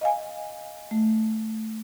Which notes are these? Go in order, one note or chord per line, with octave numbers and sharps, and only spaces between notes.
D#5 F5 G#5
A3